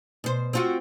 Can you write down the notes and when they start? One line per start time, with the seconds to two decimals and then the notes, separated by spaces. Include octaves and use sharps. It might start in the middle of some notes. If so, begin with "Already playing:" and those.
0.24 B2 C5
0.53 C4 F4 F#4